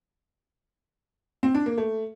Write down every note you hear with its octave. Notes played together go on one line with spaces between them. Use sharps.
C4
D4
A#3
A3